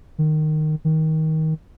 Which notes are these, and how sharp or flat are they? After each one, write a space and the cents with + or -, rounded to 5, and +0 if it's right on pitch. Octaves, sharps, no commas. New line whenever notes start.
D#3 -15
D#3 +20